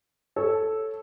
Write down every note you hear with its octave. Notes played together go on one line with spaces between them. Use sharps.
A4 C#5